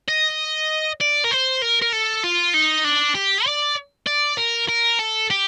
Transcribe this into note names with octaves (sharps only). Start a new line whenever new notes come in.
D#5
D5
A#4
C5
A#4
A#4
A4
F4
D#4
D4
G4
D5
D5
A#4
A#4
A4
G4